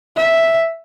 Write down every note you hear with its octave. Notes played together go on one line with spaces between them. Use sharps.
E5